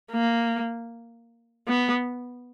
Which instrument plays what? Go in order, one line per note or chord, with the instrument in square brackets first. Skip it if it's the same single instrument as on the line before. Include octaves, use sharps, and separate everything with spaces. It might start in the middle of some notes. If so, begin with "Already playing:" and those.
[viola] A#3
B3